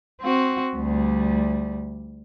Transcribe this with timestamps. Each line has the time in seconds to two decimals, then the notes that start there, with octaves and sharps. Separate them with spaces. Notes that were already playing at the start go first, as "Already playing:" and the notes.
0.21 C4 F#4
0.77 D2 G3